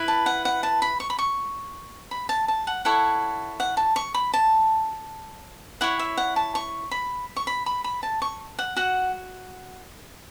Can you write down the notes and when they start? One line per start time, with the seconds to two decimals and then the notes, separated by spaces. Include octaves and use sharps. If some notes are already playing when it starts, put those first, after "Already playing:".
Already playing: E4 B4
0.08 A5
0.26 F#5
0.45 F#5
0.63 A5
0.82 B5
1.00 C#6
1.10 B5
1.19 C#6
2.11 B5
2.29 A5
2.48 A5
2.67 F#5
2.85 E4 A4 C#5 F#5
3.60 F#5
3.77 A5
3.96 C#6
4.14 B5
4.34 A5
5.81 E4 C#5 F#5
5.99 E5
6.17 F#5
6.36 A5
6.55 C#6
6.91 B5
7.36 C#6
7.47 B5
7.66 B5
7.84 B5
8.03 A5
8.22 C#6
8.59 F#5
8.76 F#4 F#5